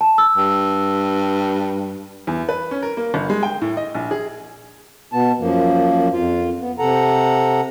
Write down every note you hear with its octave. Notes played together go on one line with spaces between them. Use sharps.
A5
E6
G2
E2
B4
C#4
A#4
A#3
G1
G#3
G5
A2
D#5
A#1
G#4
B2 B3 A5
F#2 F3 A#3
F2 F4
B3
C3 A4 F#5 A#5